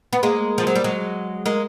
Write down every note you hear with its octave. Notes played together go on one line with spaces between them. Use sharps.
B3
G#3 A#3
F3
F#3
G3
F#3 G#3
G#3 A#3